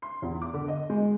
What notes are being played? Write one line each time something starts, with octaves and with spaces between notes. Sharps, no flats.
C6
E2
D6
D3
D#5
G#3